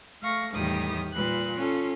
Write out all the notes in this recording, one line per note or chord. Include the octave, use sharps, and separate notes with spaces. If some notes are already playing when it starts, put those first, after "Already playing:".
A3 F5 C#6 A#6
E2 A2 D#3 G3 G4 D#6
A#2 G3 B4 F#6
C#4 F4 A4